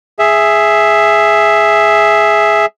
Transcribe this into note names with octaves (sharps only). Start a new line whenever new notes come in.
G#4 E5